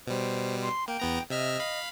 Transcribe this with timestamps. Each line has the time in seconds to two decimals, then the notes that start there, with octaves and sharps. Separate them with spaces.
0.07 B2 G3 C5
0.61 C6
0.88 A#3 G5
1.00 E2 B3 A#5
1.30 C3 D#5 E5 F6
1.60 F5 B5